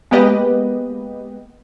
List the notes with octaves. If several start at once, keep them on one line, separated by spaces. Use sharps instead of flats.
G#3 A#3 B3 G4 B4 D#5